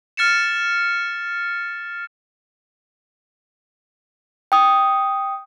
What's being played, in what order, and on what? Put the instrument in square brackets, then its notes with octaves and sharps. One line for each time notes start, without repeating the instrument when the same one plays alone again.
[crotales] F6 A6 C#7 E7
[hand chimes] G5 D#6